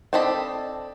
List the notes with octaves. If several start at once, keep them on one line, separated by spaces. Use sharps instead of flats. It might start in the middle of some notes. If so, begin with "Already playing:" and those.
C4 D4 A4 D#5 B5